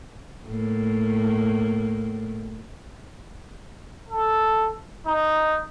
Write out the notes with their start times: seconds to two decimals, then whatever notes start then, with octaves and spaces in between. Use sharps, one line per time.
0.47 A2 A#3
4.09 A4
5.06 D#4